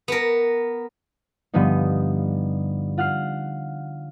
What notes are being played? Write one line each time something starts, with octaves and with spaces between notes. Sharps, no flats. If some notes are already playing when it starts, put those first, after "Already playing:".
B3 A#4
G2 D3 F3 B3 D#4
F4 F#5 F6 C7